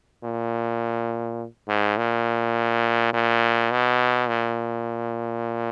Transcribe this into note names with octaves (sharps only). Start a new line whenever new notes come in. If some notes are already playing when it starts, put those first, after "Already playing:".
A#2
G#2
A#2
A#2
B2
A#2